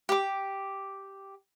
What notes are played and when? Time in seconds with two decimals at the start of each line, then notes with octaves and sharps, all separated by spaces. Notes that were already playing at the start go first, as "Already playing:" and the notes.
0.09 G4 D6